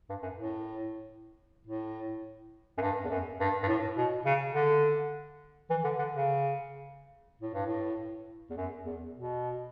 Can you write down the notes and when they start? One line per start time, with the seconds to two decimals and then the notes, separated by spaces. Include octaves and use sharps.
0.09 G2
0.22 F#2
0.37 A2
1.67 A2
2.78 F#2
2.81 G2
3.05 E2
3.10 F#2
3.40 G2
3.63 G2
3.68 A2
3.97 B2
4.26 C#3
4.54 D3
5.70 E3
5.84 D3
5.99 D3
6.13 C#3
7.42 A2
7.54 G2
7.66 A2
8.50 E2
8.57 F#2
8.86 E2
9.15 B2